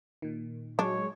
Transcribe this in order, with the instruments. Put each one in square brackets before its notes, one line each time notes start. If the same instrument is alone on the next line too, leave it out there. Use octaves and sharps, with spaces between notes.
[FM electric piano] A#2 D#3
[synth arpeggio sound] F#3 G#3 [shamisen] D4 [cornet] C#5